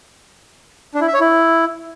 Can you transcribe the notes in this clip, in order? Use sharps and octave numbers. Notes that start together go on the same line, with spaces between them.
D4
E4
E5
C#5
E4